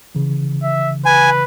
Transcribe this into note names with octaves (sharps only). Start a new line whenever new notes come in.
C#3 E3
E5
B4 G#5